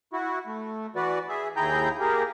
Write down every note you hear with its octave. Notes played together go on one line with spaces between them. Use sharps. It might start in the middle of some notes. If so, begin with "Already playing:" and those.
E4 F#4
A3
E3 F#4 B4 D5
G#4 E5
D#2 E4 G#4 G5 A#5 G6
A#3 G4 G#4 A#4